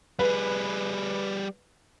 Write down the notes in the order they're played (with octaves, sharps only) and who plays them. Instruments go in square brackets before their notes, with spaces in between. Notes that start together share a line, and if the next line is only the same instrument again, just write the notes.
[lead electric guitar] G3 G#4 [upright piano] B4